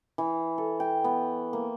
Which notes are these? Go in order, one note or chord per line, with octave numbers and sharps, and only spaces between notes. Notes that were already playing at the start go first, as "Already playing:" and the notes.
E3
A4
G5
B3
A#3